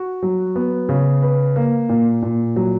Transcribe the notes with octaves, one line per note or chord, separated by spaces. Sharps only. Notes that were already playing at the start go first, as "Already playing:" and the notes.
Already playing: F#4
F#3
B3
C#3
B4
A#3
A#2
A#2
F#3